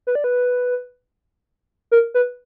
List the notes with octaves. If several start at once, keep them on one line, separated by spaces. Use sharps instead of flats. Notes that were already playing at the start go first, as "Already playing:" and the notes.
B4
D5
B4
A#4
B4